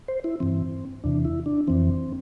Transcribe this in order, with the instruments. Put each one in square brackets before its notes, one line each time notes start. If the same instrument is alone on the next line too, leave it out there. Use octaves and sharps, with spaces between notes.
[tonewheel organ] C5
E4
G2 E3 C4
E2 C3 E3 D4
E4
D4
F2 E3 C4